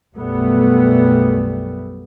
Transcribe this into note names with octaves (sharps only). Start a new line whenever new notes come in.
B1 F#2 G3 A3 B3